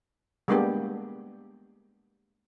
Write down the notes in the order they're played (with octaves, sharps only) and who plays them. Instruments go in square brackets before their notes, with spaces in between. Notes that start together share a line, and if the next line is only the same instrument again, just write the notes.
[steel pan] G3 G#3 A#3 B3 D4 G4